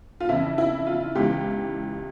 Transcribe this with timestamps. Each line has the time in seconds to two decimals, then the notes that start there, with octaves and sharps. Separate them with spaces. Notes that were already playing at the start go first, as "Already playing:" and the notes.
0.20 F4
0.29 F2 C#3 E3 E4
0.58 E4
0.87 F4
1.15 C#2 C#3 E3 G4